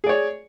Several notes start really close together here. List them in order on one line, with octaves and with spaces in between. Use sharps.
G#4 D5 C#5